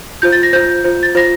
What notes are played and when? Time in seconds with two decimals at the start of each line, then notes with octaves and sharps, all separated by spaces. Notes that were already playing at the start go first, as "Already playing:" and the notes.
0.22 F4 C5 G6
0.32 A6
0.43 A#6
0.53 F4 C5 G6
0.84 F4 C5
1.03 A6
1.15 F4 C5 A#6